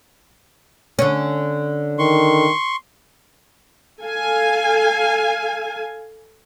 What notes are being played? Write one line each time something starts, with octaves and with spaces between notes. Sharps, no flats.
D3 C#4
D#3 C6 C#6
A4 F5 G#5